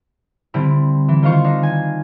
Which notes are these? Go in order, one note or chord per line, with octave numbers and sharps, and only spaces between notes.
D3 G3 C4 E4
E3
D#3 F4 C5 F5 C#6
D4 D#4
G#5